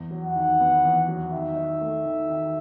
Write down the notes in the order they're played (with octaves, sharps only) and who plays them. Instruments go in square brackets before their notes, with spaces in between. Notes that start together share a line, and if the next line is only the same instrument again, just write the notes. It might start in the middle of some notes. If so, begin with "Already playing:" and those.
Already playing: [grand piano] E2
F#3
[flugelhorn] F#5
[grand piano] D#3
B3
E2
F#3
[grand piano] D#3 [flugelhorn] E5
[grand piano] D#4
A3
D#3
D#3